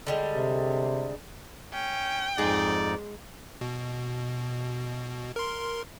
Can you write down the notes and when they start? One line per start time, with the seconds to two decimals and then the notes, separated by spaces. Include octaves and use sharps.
0.07 D3 G3 G#3
0.33 C3
1.73 C#4 G5
2.38 F2 G#2 G#3 D#4 G#4 D5
3.61 B2
5.36 A#4 C6